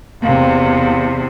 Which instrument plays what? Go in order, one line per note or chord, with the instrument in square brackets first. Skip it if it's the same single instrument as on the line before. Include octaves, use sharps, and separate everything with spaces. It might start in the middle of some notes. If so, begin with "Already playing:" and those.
[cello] E2 C3 [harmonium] A#3